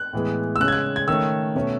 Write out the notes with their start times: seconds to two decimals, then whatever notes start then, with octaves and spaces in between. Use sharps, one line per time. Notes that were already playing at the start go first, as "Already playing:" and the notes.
Already playing: F#6
0.13 A2 E3 G#3 B3
0.56 E6
0.60 C#3 G#3 C#4 F#6
0.68 G#6
0.72 F#6
0.96 G#6
1.08 D#3 A3 C#4 E6
1.55 B2 A3 C#4